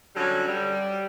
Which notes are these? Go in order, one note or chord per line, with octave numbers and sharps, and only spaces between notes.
D3 F#3 G3 C#4
G3